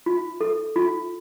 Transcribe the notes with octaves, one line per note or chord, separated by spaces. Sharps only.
F4
A4
F4